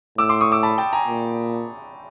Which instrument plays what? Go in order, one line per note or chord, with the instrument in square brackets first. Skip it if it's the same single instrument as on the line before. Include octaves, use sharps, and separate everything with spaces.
[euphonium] A2 [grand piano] D6 E6
[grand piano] C6 D6
C#6 D#6
D6 E6
A5 B5
G5 A5
G#5 A#5
[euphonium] A#2